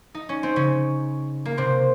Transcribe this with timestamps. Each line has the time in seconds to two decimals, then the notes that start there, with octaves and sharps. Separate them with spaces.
0.15 D#4
0.29 C#4
0.43 C4
0.56 C#3 C#4
1.45 A#3
1.57 C3 C4